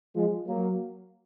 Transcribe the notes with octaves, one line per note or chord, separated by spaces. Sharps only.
F3 G#3
F#3 A#3